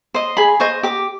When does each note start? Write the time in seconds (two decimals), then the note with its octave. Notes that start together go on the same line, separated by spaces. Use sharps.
0.14 C5 D#5
0.37 G#4 B5
0.60 C5 D#5 C#6
0.83 G4 D6